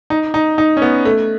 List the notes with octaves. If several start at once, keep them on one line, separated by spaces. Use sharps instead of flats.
D#4
D#4
D#4
C#4
B3
A3